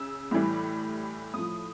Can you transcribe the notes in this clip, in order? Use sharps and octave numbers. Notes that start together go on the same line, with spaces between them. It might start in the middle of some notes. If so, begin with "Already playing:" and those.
Already playing: C#3 E6
A2 E3 G3
A2 F3 D#6